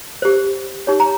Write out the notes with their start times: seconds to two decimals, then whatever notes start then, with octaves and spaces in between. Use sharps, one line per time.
0.22 G4 C5
0.87 D#4 G4 C#5
1.00 A#5